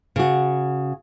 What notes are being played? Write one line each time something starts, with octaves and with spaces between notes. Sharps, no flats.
C#3 F#4